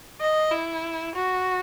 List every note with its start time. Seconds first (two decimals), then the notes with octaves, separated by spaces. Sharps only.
0.21 D#5
0.52 E4
1.15 F#4